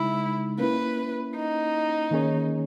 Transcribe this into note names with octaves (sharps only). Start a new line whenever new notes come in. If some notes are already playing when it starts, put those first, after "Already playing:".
Already playing: C#3 G#3 D#4 E4
A#3 C#4 E4 B4
D#4
D#3 A#3 C#4 G#4 C#5